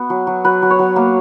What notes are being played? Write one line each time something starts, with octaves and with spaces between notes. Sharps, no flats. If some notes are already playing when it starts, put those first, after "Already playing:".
Already playing: B3 F#4
F#3
F#3
F#3 B4
F#3
C#5
F#3
A#3